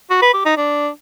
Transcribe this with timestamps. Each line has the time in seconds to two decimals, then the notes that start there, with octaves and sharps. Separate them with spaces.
0.10 F#4
0.22 B4
0.34 G4
0.45 D#4
0.57 D4